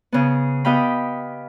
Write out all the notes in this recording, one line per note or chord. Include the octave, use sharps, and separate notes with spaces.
C#3 B3
B3 G4 D#5 F5 G5 B5